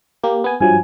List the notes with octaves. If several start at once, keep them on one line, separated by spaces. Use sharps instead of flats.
A#3 G4
B3 G#5
G2 F3 F#3 G#5